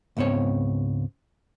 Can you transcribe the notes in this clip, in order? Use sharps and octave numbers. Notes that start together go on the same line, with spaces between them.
C#2 G#2 B3 C4 C#5